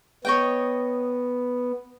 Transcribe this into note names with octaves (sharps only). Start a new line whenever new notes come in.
B3 C#5 D#5 G5